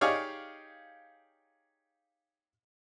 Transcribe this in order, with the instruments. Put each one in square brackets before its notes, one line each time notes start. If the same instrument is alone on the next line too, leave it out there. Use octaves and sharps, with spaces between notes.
[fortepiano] D#4 G4 G#4 C#5 D5 F5